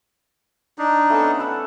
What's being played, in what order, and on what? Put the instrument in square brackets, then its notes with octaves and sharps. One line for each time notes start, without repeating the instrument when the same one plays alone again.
[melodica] D4 D#4
[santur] A3 B3 C#4
F#5
B4 E5 F#5